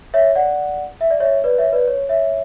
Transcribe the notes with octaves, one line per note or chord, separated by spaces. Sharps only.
C#5 E5
D5 F#5
E5
D5
C#5 E5
B4 D5
C#5 E5
B4 D5
C#5
C#5 E5